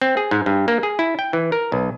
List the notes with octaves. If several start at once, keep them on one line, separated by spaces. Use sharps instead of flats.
C4
G#4
G#2
G2
A#3
G#4
E4
G5
E3
A#4
B1